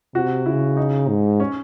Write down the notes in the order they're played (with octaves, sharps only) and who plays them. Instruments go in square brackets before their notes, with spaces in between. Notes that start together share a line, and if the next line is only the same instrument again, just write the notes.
[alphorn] C3 [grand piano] F#4
[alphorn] C#3 [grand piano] E4
[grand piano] D#4
[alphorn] G#2
[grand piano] C#4